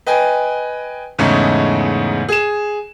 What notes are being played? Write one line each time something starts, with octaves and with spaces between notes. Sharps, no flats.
B4 D#5 G5 G#5
E2 G#2 C#3 A3 C#4 D#4
G#4 E7